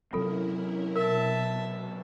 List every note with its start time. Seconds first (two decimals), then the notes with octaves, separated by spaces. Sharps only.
0.13 C3 F#3 C4 C#4 E4 F4 A4 A#4
0.96 B2 A#4 E5 A5